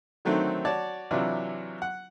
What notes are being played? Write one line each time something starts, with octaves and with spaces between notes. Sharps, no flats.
D3 D#3 F#3 A3 C4
F#4 C#5 D5 A5
C3 E3 F#3 D4 E4 F4
F#5